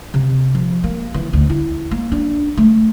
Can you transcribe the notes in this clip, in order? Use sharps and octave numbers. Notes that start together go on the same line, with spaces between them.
C3
F3
A#3
E3
D2
E4
A#3
D4
A3